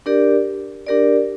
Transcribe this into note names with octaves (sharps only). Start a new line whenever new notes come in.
D4 G4 A#4 D5
D4 G4 A#4 D5